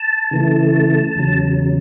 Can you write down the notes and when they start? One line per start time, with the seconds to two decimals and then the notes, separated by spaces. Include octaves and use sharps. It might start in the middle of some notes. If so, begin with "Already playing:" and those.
Already playing: A5
0.31 C#3 E3 A3
1.15 E2 C#3 F#3